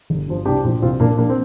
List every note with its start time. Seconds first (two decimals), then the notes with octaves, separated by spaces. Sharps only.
0.10 G1
0.28 G2 F3
0.45 C2 D4 G4
0.64 A#2 F3
0.82 C2 C4 F4
1.00 A#2 F3 A#3 D4
1.18 A#1 A#3 D4
1.30 C4